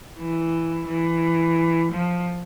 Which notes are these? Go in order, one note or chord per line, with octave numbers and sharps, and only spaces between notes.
E3
E3
F3